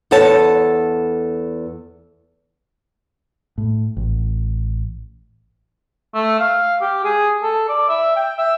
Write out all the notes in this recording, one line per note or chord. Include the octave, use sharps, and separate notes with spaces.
E2 B3 A4 C#5 A5
A2
A1
A3
F5
G4
G#4
A4
D5
E5
G5
E5